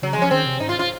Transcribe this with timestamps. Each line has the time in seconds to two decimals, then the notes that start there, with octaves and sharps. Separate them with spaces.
0.02 C#3 F#3
0.13 G#3
0.18 F3 C#4
0.31 D#3 C4
0.46 C3
0.60 G#2 D#4
0.69 F4
0.79 F4